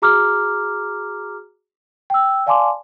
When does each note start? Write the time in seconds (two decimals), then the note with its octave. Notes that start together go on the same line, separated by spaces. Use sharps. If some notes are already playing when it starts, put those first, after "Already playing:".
0.02 F#4 G#4 A#5 D6 F6
2.10 G5 E6
2.46 D5 F5 G#5 A5 C6 D6